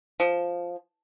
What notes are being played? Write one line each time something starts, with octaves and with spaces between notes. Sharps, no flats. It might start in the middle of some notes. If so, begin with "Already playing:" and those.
F3